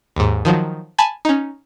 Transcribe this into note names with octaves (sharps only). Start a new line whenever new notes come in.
D#2 G#2
D#3 F3 F#3
G#5 A5 B5 G#6
C#4 D#4